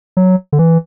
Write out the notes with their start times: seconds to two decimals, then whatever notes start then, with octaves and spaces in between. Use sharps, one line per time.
0.17 F#3
0.53 D3
0.59 E3